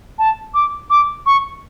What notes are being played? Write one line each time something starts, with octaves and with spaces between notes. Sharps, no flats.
A5
D6
D6
C#6